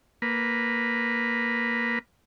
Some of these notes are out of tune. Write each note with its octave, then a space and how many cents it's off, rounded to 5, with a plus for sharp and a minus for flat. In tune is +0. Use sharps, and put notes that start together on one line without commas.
A#3 +0 B4 +0